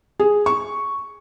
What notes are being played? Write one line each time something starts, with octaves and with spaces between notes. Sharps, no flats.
G#4
C#6